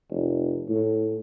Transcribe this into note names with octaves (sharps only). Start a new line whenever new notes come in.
F1
A2